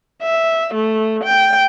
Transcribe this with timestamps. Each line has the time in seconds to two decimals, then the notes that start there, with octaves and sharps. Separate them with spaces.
0.23 E5
0.75 A3
1.24 G5